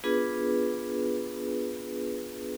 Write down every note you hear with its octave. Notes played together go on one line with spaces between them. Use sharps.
B3 D4 F4 G#4 B4